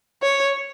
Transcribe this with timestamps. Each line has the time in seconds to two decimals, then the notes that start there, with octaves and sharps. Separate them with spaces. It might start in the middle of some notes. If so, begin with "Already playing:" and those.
0.22 C#5